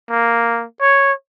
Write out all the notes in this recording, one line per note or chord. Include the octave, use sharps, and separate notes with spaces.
A#3
C#5